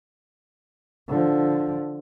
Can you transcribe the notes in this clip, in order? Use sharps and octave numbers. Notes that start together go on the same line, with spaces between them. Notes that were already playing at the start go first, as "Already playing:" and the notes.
D3 F3